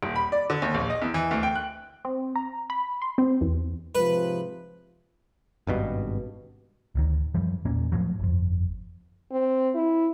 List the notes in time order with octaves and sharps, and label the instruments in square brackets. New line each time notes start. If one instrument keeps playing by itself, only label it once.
[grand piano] D#1
B5
D5
D3
D#2
A#1
D#5
E2
E3
D2
G5
F#6
[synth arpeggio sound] C4
A#5
B5
C6
C4
E2
[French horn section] G#2 C3 F3 [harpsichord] B4
[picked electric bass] G#1 G2 B2
D1 D2 D#3
F#2 E3 F3 G3
E2 A#2 A#3 C#4
A2 F3 F#3
G1 F2
[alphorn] C4
E4